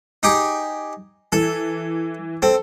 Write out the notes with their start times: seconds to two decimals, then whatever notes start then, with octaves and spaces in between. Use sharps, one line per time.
0.23 D#4 G4 G#4
1.32 E3 A4
2.42 C4 A4